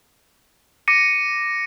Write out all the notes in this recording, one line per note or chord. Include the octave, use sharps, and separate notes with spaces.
D6 A#6 C#7 D#7